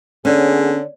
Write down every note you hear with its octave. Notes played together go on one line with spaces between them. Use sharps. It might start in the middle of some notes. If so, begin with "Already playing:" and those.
D3 A#3 B3 C#4 G#4 C#5 D5